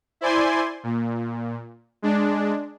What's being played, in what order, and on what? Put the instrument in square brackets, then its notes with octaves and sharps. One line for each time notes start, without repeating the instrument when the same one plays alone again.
[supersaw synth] E4 C5 D5 G#5 C6
A#2
G#3 D4